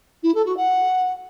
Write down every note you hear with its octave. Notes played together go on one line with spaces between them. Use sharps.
E4
A4
F#4
F#5